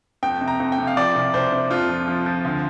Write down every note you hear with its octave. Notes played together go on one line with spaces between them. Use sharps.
F2 G5
C3
A#5
F2
G5
C3
F5
F3 D5
C2
C2 C5
C3
F2 F4
F3
F3
F3
D2